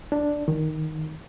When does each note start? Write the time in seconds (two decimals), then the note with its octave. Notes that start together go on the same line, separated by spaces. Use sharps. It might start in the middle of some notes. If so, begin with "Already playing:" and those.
0.12 D4
0.48 D#3